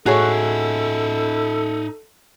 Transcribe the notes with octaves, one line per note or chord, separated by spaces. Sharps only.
A2 D#4 F#4 G#4 A4 C#5 E5